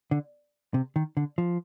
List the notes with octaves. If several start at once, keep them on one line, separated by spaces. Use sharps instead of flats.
D3
C3
D#3
D3
F3